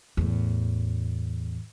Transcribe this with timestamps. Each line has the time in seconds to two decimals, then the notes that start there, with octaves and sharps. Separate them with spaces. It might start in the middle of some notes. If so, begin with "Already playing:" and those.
0.17 E2 A2